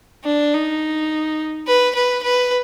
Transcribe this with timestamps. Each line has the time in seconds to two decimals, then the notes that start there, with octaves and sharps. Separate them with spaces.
0.24 D4
0.54 D#4
1.67 B4
1.95 B4
2.23 B4